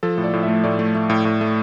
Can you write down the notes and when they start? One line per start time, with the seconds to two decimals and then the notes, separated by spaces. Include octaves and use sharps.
0.03 F3 A4
0.18 A2
0.24 D5
0.33 A2
0.43 E5
0.48 A3
0.64 A2 D5
0.79 A3
0.95 A3
1.10 A2
1.25 A2
1.41 A3